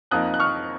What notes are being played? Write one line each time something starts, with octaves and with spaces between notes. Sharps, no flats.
F2 F3 A#3 D#4 D#6 F#6
F#6
C#6 F6